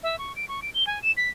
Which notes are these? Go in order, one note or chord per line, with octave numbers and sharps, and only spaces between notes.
E5
C#6
D7
C#6
D7
G7
G#5
E7
B6